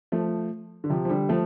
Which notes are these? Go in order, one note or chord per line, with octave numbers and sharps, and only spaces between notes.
F3 A3
D3
C3 F3
F3
D3 G3
F3 A3